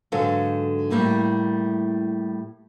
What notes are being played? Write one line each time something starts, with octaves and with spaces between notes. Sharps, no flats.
G#2 D3 F#3 A4 B4 F5
A2 G3 A#3 E4